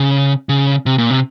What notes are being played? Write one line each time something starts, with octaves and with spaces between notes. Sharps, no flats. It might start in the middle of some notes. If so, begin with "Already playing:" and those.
Already playing: C#3
C#3
C3
A#2
C3